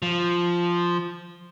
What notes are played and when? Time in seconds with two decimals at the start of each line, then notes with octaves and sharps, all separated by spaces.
0.02 F3